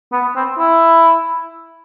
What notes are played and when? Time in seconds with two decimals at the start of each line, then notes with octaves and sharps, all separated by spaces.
0.12 B3
0.35 C4
0.58 E4